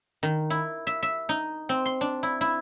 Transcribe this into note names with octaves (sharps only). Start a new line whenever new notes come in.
D#3
E4
E5
E5
D#4
C4
C6
D4
E4
E4